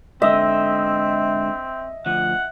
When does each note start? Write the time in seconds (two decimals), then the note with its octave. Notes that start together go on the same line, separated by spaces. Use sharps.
0.22 G#2 D3 C4 D#5 E5
2.06 D2 F3 F#5